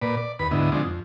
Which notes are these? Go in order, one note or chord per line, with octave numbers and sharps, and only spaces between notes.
A#2 B4 D5
D5
D#2 B4 B5
D2 G#2 D3 B3 E4 D#5
D3 F3 G#3 C4 D4 D#4
F2